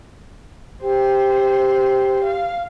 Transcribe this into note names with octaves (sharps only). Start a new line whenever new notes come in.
G4 C5
F5